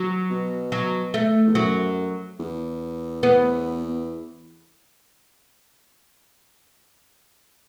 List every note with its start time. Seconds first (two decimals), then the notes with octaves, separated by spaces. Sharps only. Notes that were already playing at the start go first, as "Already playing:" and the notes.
Already playing: F#3
0.30 B2
0.72 F#3
1.14 A3
1.47 E2
1.55 F#2 F#3
2.39 E2
3.23 B3